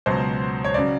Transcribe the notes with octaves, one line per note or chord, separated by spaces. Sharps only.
C#2 B2 F#3 C5
C#5
C#3 F#3 D5